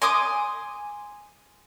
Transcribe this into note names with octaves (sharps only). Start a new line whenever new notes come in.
G#5 C6 D6 D#6